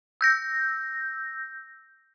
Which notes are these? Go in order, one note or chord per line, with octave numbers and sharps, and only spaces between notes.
E6 G6 A#6